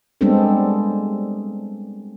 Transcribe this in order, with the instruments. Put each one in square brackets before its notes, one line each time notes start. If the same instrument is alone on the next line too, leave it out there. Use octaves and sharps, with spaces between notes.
[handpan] G3 G#3 B3 C4 D4 A4